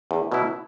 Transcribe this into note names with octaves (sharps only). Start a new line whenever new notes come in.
E2
B2 F#3 B3 E4